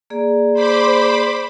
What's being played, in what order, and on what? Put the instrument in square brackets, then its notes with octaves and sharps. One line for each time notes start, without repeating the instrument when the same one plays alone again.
[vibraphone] A#3 G#4 D5
[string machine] C5 B5 D6